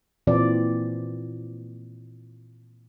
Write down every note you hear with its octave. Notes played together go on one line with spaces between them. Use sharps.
A#2 E3 C4 D5